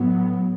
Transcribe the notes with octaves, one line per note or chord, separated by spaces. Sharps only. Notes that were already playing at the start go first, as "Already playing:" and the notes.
Already playing: A2 F#3 B3